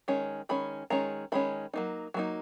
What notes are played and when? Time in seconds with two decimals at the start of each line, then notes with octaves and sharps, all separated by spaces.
0.08 D#3 G#3 C#4
0.49 D#3 G#3 C#4 B5
0.90 D#3 G#3 C#4 A#5
1.32 D#3 G#3 C#4 B5
1.74 F#3 A#3 D#4
2.14 F#3 A#3 D#4